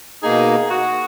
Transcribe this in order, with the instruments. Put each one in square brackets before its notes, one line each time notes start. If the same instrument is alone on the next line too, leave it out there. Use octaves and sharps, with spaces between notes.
[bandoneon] B2 A#3 D#4 [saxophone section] G#4
[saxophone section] F#4